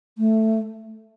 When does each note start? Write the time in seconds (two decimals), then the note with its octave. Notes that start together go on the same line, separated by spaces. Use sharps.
0.18 A3